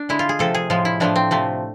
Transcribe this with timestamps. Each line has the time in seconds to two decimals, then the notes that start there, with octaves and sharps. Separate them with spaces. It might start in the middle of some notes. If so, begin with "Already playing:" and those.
Already playing: D4
0.09 D3 G#3 E4
0.19 F4
0.29 G#4
0.39 C3 F3 A3 A4
0.55 G#4
0.70 A2 F3 G#3 F4
0.85 E4
1.00 A2 F3 A3 D4
1.16 C4
1.31 C3 F3 A3